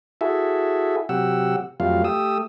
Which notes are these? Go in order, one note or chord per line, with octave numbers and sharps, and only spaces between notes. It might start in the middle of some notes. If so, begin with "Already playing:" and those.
E4 F#4 G#4 A4 E5
C3 F#3 G4 F#5 E6
F2 F#3 G3 A3 F4 F5
A3 G4 D#6 E6